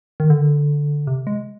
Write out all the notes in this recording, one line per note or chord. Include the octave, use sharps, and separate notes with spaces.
D#3
D3
C3
G#3